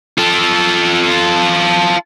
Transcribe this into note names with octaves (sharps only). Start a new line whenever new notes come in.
F4 A4